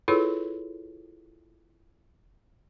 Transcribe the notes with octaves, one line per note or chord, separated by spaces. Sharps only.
E4 F4 G#4 A4 B4 C#5